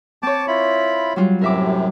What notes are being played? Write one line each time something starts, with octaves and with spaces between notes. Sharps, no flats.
C4 C#5 A5 D6
E4 F4 B5
F#3 G3 F4
F#2 A2 C3 A#4 E5 D6